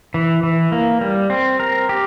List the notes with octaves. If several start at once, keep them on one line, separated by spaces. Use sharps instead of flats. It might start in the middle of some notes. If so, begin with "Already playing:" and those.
E3
E3
A#3
G3
C4
A#4
G4